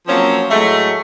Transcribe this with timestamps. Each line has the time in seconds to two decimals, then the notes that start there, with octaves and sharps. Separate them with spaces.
0.08 F3 F#3 A#3 C4 C#4
0.50 A2 F#3 G#3 A3